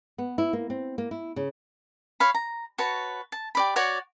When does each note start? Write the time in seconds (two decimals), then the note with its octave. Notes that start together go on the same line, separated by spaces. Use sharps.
0.18 B3
0.38 E4
0.53 A#3
0.70 C4
0.98 A#3
1.11 E4
1.36 C#3
2.20 C#5 F5 B5
2.34 A#5
2.78 F#4 B4 C#5 A5
3.32 A5
3.55 G4 D5 B5
3.76 F#4 C#5 D5 F#5